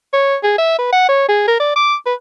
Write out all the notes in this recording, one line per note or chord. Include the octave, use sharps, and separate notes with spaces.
C#5
G#4
E5
B4
F#5
C#5
G#4
A#4
D5
D6
B4